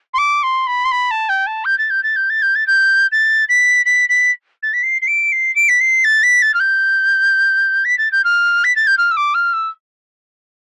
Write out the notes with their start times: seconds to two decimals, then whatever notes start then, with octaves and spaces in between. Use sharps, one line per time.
0.14 C6
0.18 D6
0.43 C6
0.67 B5
0.85 C6
0.91 B5
1.11 A5
1.29 G5
1.47 A5
1.65 G6
1.78 A6
1.90 G6
2.03 A6
2.16 G6
2.30 A6
2.42 G6
2.55 A6
2.67 G6
3.12 A6
3.49 B6
3.86 B6
4.09 B6
4.63 A6
4.73 B6
4.83 C7
5.02 C7
5.08 D7
5.32 C7
5.55 D7
5.69 B6
5.80 C7
6.04 A6
6.23 B6
6.42 A6
6.54 F6
6.60 G6
7.85 B6
7.98 A6
8.12 G6
8.24 F6
8.64 B6
8.76 A6
8.87 G6
8.98 F6
9.11 E6
9.17 D6
9.34 F6
9.53 E6